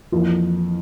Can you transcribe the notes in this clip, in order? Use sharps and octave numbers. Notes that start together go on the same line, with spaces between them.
F2 E3 A#3 F4